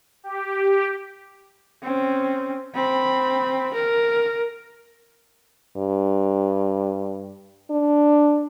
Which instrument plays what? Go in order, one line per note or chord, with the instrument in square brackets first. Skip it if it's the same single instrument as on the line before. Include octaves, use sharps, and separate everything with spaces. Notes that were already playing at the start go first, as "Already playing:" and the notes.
[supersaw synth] G4
[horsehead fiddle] C4 C#4
C4 B5
A#4
[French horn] G2
D4